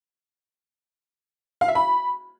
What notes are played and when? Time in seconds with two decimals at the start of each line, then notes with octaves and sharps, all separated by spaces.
1.61 F5
1.68 E5
1.75 B5